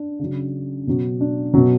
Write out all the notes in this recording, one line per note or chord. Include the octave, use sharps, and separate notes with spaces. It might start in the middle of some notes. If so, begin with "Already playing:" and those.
Already playing: D4
C#3 F#3
B2 F#3
D4
B2 F#3